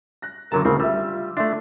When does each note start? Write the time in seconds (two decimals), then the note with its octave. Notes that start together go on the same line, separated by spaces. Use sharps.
0.22 F#6 A#6
0.52 F#1 D3 F#3 A#4 A5 A#5
0.65 D2 C#3 C4 A#4
0.80 G3 F4 E5 E6
1.37 A3 D4 E5 C6